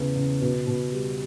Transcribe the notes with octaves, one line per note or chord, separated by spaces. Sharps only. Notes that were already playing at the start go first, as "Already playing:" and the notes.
Already playing: E2 C#3
C#3
B2
B2
G3